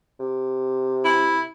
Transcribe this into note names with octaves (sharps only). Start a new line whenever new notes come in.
C3
E4